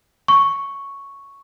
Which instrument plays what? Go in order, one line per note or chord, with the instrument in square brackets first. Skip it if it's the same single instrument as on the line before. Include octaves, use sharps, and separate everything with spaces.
[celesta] C#6